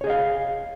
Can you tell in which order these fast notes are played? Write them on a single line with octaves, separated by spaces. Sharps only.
C#5 G#4 D#5 F5